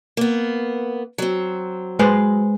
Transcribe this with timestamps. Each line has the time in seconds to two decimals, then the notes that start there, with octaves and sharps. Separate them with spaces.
0.17 A#3 B3
1.18 F#3 C4
1.99 G#3 B4 C5